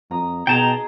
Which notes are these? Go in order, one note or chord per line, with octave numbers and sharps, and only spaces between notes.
F2 A#5 D#6
B2 D#4 G#4 G5 A5 A#5